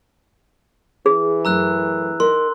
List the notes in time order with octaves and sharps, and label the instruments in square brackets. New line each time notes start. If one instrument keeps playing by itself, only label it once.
[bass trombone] E3 [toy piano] G#4
[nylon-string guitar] F#2 A3 [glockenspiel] A#5 E6 F#6
[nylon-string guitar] D#4 A#4 [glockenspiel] C6